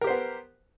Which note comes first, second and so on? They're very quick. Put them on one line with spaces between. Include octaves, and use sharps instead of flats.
A#4 G4 C5 B3